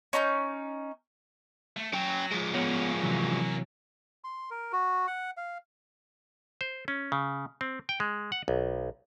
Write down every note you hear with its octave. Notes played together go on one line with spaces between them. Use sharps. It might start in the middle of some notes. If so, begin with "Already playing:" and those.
C#4 D#4 B5 G6
A3
F#3 C#4 G5
F3 G#3
A#3 B3 C#4 C#5 F#5
C3 E3 F#3
C6
A#4
F#4
F#5
F5
C5
C#4
C#3
C4
G5
G#3
F#5
B1